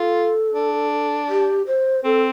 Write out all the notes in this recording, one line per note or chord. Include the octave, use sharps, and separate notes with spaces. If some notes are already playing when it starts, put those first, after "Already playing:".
Already playing: F4 A4
D4
G4
C5
C4 A4